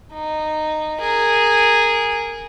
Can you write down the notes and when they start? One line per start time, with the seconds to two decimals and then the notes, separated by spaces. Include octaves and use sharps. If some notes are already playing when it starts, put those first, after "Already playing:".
0.14 D#4
0.99 G#4 A#4